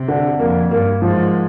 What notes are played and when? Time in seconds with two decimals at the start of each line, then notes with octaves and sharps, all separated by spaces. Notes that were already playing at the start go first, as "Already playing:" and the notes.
Already playing: C3
0.08 D3
0.39 F2 A#3
0.71 G2 A#3
1.02 G#2 F3